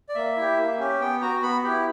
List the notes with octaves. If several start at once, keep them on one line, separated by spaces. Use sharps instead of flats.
D5
A#3 E5
E4 G4
A#3
C#4 G4
B3 G5
F#4 A#5
B3 B5
E4 G4